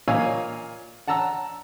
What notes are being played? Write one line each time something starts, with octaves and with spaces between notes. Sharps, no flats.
A#2 C#5 D#5 F5 G#5 E6
F#5 A5 A#5 E6